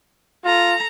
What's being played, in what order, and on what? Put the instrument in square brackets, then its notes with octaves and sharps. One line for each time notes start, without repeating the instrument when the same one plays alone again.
[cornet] F4 [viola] A4 A#5